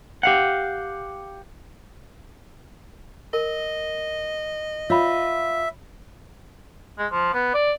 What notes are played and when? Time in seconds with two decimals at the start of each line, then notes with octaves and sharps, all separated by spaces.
0.23 G4 F5 F#5
3.33 A#4 D#5
4.90 F4 C#5 E5 B5
6.98 G#3
7.12 F3
7.34 B3
7.54 D5